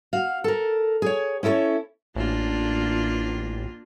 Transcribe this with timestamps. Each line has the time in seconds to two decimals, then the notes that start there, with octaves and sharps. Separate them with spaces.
0.13 F#4 F5
0.44 A4 A#4
1.02 G#4 C#5
1.43 C#4 E4 A4 A#4 C#5
2.15 A1 A#3 D4 F4